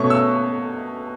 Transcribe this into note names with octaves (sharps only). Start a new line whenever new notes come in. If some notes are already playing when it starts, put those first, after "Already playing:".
Already playing: B2 A3 C#4 C#6
E6